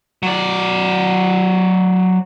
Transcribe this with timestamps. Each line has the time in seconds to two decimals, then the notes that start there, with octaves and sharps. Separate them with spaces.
0.23 F#3 D5